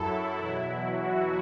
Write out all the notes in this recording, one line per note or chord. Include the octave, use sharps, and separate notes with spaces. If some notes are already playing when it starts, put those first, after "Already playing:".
Already playing: F#2 F#3 E4 A4
E2 B2 F#3
F#4